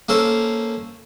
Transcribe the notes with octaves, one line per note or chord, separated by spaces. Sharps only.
A#3 C#4 A4 A#4 C5